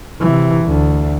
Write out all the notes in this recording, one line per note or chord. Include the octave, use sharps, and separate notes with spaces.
C3 E3
D2